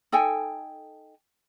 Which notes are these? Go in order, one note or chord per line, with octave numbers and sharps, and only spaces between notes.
D#4 A4 G5 G#5